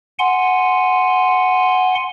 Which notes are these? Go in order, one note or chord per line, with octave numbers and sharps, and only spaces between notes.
F#5 G#5 C6